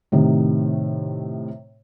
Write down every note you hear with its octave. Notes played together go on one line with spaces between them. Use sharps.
A2 C3 D#3